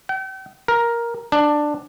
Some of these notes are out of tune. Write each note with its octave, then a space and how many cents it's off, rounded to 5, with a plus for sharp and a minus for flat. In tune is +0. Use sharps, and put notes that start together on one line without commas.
G5 -40
A#4 +10
D4 +10